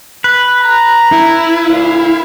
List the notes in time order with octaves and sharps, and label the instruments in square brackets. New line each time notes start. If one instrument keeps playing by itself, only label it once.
[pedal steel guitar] B4
[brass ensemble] A#5
[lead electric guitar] E4
[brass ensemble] D2 A#2 F5